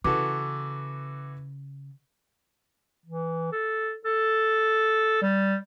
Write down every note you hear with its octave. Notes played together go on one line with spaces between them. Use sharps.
C#3 E3 F#4 A4 D6
E3
A4
A4
G3